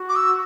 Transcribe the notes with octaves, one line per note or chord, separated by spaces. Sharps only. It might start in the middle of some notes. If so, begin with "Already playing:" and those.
Already playing: F#4
D6
E6